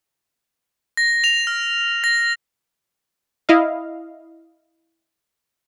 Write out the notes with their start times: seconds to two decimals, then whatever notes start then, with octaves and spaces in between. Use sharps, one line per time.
0.97 A#6
1.24 F7
1.47 F6
2.04 A#6
3.49 E4 D#5 F5